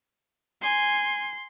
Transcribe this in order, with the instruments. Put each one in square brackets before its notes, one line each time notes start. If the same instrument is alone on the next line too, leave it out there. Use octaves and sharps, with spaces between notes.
[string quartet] G#5 [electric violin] C6